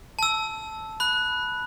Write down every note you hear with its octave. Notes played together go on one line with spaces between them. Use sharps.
A5 E6
B5 F#6